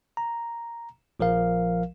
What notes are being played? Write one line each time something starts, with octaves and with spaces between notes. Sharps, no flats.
A#5
A#1 F3 A#4 F5